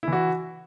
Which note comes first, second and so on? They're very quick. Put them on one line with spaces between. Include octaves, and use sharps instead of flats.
E4 E3 F#4